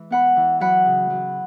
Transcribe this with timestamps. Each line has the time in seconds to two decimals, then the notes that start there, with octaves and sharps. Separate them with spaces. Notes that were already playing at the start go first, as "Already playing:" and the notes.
Already playing: E3 G#3
0.10 B3 F#5 B5
0.36 E3
0.60 F#3 F#5 B5
0.86 C#3
1.10 F#3